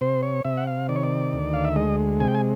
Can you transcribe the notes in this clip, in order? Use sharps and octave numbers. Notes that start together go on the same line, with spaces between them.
C3 C5
C#5
C3 E5
F#5
F5
D#3 D5
C#5
D5
D2
F5
E5
G#3 D#5
C3 G#5
G5
G#5